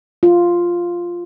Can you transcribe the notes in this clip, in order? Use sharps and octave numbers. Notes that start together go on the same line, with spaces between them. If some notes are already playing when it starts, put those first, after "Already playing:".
F4